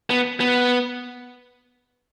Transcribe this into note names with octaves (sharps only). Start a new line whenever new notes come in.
B3
B3